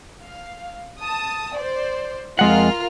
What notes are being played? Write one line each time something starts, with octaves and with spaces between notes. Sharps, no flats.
F5
A5 D#6
C5 D5
F2 G#3 F4 A#4 F#5 F6